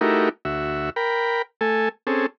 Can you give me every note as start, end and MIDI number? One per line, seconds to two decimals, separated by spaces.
0.01 0.29 57
0.01 0.29 63
0.01 0.29 64
0.01 0.29 66
0.01 0.29 67
0.01 0.29 70
0.45 0.90 38
0.45 0.90 66
0.45 0.90 76
0.96 1.42 70
0.96 1.42 79
0.96 1.42 83
1.61 1.89 57
1.61 1.89 69
1.61 1.89 80
2.07 2.26 60
2.07 2.26 61
2.07 2.26 68
2.07 2.26 69